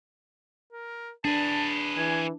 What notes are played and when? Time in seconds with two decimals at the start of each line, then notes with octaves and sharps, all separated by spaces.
0.72 A#4
1.25 D4 G#4 B4 A5
1.97 E3 G#5